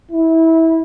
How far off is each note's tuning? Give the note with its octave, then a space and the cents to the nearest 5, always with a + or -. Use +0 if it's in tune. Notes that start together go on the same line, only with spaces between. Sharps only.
E4 -20